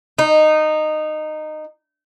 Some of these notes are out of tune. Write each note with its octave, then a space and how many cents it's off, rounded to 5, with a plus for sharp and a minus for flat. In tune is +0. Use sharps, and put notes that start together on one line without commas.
D#4 -15